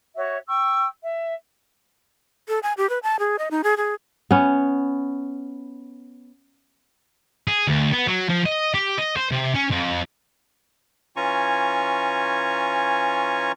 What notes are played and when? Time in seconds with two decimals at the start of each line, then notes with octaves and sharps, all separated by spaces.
0.15 F#4 C#5 E5
0.47 G5 C#6 E6
1.02 E5
2.48 A4
2.63 G#5
2.77 G4
2.90 B4
3.03 A5
3.19 G#4
3.39 D#5
3.51 D#4
3.64 G#4
3.77 G#4
4.31 B3 C#4
7.47 G#4
7.67 D2
7.92 B3
8.07 F#3
8.29 F3
8.46 D#5
8.74 G4
8.98 D#5
9.17 C5
9.32 C3
9.55 C#4
9.71 F2
11.16 E3 C#4 F4 G#5 A#5 C#6